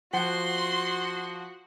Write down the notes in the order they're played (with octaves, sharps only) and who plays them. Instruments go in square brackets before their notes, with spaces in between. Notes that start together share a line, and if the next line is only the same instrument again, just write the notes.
[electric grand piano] F3 [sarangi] F#4 [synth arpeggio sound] F#5 F#6 [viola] C6